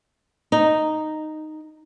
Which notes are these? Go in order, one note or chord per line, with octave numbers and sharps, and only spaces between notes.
D#4